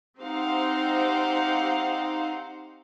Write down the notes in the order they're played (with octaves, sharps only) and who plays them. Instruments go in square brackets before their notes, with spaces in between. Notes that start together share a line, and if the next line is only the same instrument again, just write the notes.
[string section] C4 D#4 G4 C5 F5 F#5